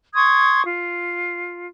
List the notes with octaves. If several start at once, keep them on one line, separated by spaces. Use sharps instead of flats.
C6 C#6 D#6 G#6
F4